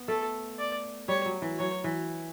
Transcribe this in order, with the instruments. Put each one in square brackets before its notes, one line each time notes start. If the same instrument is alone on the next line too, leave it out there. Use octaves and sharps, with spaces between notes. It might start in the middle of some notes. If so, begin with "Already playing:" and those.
Already playing: [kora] B3
[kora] A3 [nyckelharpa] A4
[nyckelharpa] D5
[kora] G3 [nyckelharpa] C#5
[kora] F#3
E3
[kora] F#3 [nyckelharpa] C#5
[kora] E3